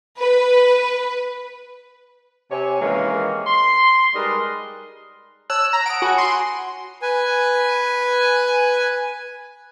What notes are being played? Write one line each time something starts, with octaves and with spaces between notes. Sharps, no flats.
B4
C3 C#5 G#5
D#3 E3 G#3 A#3 C4 C#4
C6
G3 G#3 D#4 A#4 B4 D#5
C#5 A5 E6 F#6
A#5
F#5 D#6 D7
F#4 G#5 B5
C6
B4 G#5